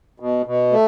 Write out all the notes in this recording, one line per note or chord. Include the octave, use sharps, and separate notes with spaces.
B2
B2
A3